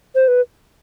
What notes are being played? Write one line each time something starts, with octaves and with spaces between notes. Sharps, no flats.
C5
B4